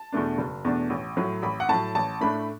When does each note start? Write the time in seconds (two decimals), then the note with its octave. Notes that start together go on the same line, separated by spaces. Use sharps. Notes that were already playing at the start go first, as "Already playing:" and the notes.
Already playing: A5
0.13 E2 B2 A3 D4
0.38 F#1
0.65 E2 B2 A3 D4
0.90 A1
1.17 A2 F#3
1.42 A1 B5
1.60 F#5
1.69 A2 F#3 A5
1.95 A1 A5
2.21 A2 A3 D4 B5